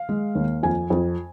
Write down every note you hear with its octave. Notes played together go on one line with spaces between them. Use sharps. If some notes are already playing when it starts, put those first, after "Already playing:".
Already playing: F5
G#3
D#2
F2 G#5
F2